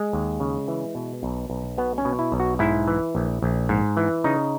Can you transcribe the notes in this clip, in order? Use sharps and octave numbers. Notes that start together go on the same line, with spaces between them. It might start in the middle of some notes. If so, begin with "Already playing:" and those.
Already playing: G#3
D#2
C#3
E3
B2
B1
B1
B2 B3
C#4
B2
E4
B1
F#4
G#2 E4
E3
A#1
A#1
G#2
E3
C#3 D#4